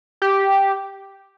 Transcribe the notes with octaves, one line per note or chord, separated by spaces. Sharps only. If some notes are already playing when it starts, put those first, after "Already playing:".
G4